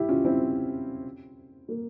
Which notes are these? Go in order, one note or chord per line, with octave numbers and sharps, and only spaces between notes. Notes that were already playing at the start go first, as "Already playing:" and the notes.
Already playing: E4 G4
C#4 F4
C4 E4
A#3